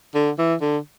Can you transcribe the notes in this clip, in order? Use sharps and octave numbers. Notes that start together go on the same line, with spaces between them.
D3
E3
D3